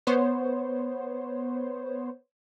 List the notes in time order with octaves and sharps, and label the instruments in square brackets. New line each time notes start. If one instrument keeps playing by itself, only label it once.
[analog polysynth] B3 C5 C#5